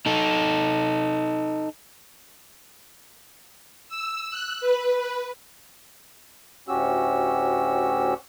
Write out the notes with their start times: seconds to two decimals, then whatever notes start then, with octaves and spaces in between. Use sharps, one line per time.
0.06 D#4 A4
3.89 E6
4.30 F#6
4.61 B4
6.68 D2 A2 C#4 F#4 G4 E6